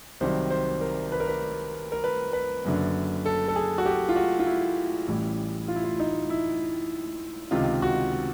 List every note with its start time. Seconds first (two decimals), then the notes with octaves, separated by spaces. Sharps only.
0.20 C2 C3 D#3 F#3 C5
0.51 C5
0.81 A#4
1.12 B4
1.20 A#4
1.28 B4
1.92 A#4
2.04 B4
2.33 B4
2.65 F#1 F#2 D3
3.26 A4
3.48 A4
3.56 G#4
3.78 F#4
3.86 G4
4.09 F4
4.16 F#4
4.40 F4
4.47 E4
5.08 A1 A2 E3 G3
5.68 F4
5.76 E4
5.84 F4
6.00 D#4
6.30 E4
7.51 C#2 C3 D#3 F4
7.82 F#4